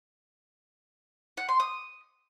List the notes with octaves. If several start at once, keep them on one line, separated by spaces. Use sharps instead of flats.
F#5
C6
D#6